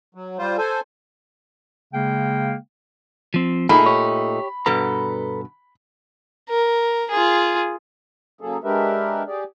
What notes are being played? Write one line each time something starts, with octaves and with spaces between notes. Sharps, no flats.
F#3
G3 F4 C5
A4 C5 G#5
C#3 G#3 A#3 F5 G5
F3 C4
A#2 A3 D#4 G#4 B5
G4 C#5
G2 B2 A4 B4 A#5
A#4
F4 G#4
C#3 F#3 A#3 G#4 A4
G#3 D4 G4 A#4 B4 E5
G4 G#4 D5